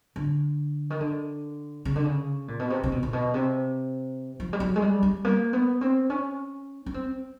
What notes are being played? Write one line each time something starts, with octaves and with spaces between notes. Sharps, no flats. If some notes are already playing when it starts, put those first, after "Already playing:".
D3
D#3
D3
C#3
D3
C#3
A#2
B2
C3
C3
B2
A#2
B2
C3
F3
G3
F#3
G#3
G3
G3
A#3
B3
C4
C#4
C#4
C4